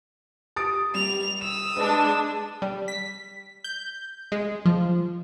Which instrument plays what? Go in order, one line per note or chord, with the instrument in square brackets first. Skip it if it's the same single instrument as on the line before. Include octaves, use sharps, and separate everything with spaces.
[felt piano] D#6 A6 D7
[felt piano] G3 [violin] F7
[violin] D#6 E6 [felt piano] E7
[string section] G#3 D4 [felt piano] B4 D#5
[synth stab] G3
B6
G6
G#3
F3